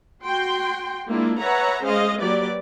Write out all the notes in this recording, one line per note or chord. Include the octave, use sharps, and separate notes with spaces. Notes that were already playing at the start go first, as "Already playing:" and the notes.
F#4 G5 C6
G#3 A#3 D4 E4 F4
B4 C#5 E5 F#5 A#5
G#3 C#4 C5 D#5 F5
F#3 A#3 G4 B4 D5